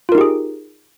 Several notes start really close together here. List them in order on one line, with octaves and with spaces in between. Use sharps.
F4 A#4 D#4 G4 G#4